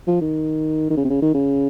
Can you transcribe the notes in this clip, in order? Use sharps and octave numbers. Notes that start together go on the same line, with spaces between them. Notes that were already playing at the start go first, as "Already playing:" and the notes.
F3
D#3
D#3
C#3
C3
C#3
D#3
C#3